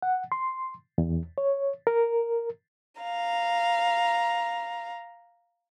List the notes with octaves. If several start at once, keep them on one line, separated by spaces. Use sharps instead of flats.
F#5
C6
E2
C#5
A#4
F5 A#5